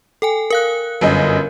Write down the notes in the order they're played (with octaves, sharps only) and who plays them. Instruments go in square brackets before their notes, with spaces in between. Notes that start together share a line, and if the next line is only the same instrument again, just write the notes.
[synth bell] A4 G5 G#5
A#4 F5 F#6
[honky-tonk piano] G1 F#2 D#5